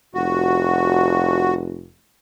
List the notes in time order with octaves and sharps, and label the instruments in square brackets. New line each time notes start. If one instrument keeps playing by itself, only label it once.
[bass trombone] F1 [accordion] F#4